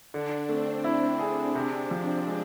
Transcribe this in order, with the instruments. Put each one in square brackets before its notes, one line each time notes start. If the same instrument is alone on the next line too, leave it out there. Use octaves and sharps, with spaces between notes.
[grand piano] D3 [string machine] D4
[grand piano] A3 [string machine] C4
[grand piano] E4
G#4
C3
F3
G#3